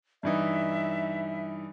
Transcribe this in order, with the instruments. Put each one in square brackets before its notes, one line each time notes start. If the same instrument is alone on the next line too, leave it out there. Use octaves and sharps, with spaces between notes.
[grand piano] G2 E3 D#4 [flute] E5